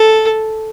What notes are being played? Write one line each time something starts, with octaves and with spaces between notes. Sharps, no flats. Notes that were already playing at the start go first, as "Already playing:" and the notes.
Already playing: A4